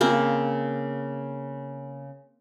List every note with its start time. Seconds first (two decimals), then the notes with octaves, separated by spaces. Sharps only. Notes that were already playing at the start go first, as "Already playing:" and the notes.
0.01 C#3 A#3 C4